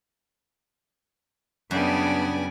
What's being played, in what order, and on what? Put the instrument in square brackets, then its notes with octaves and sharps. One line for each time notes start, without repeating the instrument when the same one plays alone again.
[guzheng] F#2 [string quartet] C#3 G3 B3 [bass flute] D4 [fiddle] D5 G#5